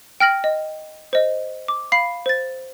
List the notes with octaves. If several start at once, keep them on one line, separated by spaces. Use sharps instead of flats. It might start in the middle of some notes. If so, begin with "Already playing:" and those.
G5 F6 A#6 F#7
D#5
C5 D#5
D6
F5 B5 C7
C5 A6